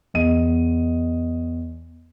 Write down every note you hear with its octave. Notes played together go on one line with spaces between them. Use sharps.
E2 D#5 D#7